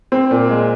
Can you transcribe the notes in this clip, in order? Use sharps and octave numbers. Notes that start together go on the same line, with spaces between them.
C4
A#2
G#3